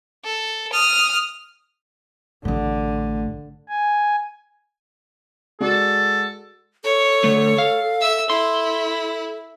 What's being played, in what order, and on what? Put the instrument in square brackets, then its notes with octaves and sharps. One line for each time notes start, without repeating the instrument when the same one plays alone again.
[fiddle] A4
D#6 F6
[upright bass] A1 A2 [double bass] D3
[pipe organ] G#5
[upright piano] G#3 F#4 D5 [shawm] A4
[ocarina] A4 [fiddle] C#5
[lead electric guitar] D3 A3
F5
[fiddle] E5 E6
[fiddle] E4 [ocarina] A4 [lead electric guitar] C6